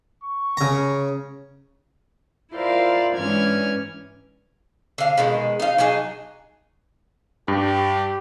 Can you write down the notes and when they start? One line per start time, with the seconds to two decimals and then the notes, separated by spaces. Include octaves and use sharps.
0.24 C#6
0.57 C#3 A#5
2.53 E4 F4 A#4 C5 D5 F5
3.16 G#2 E3 C#4 D4 F6 G#6
4.98 D3 F5
5.18 B2 D#3 G#3
5.60 D#4 F5
5.78 F#3 D4 D#4 G#4
7.48 G2 G4